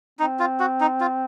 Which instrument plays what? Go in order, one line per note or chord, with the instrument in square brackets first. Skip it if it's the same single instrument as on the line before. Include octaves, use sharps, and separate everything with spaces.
[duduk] C4 [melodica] D#4
[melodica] F4
F#4
D#4
F4